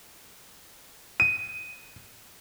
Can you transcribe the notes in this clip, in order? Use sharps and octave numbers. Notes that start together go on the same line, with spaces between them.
D#7